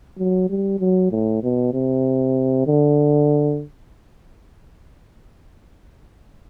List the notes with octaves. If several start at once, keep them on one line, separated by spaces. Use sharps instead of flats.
F#3
G3
F#3
A2
B2
C3
D3